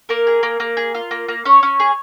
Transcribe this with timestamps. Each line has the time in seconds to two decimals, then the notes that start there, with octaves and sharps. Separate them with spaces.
0.09 A#3 A#4
0.27 G#4
0.43 A#3
0.60 A#3
0.77 G#4
0.94 F4
1.11 A#3
1.28 A#3
1.45 C#4 C#5
1.63 C#4
1.80 G#4